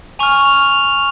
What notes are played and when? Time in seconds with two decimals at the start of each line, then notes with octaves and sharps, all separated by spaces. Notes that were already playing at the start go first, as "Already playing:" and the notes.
0.19 G#5 C#6 F6 F7
0.45 F7
0.72 F7